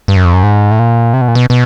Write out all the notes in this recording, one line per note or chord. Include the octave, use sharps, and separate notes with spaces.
G2
F#2
F2
F#2
G#2
A2
A#2
C3
B2
A#2
B2
B2